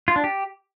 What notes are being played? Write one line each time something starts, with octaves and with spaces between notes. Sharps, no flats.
F4
D4
G4